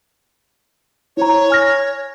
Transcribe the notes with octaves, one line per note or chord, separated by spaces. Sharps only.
E4 C5 C#5 A#5
G#5 F6 A#6